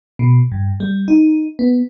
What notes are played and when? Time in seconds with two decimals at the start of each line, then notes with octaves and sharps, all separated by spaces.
0.19 B2
0.52 G2
0.80 G3
1.08 D#4
1.59 B3